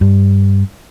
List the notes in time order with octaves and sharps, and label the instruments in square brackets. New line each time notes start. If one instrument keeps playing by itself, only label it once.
[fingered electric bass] G2